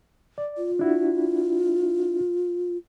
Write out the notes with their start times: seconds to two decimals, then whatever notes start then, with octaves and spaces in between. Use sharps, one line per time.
0.38 D5
0.57 F4
0.79 D4 E4 F#4